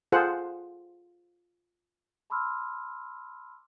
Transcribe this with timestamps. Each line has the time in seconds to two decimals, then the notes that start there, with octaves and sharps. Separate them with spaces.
0.12 F4 G#4 A4 C5 F#5
2.30 A5 B5 C6 D6 E6 F6